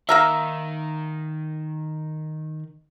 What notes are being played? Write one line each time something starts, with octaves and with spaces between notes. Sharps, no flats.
D#3 A#3 A#4 E5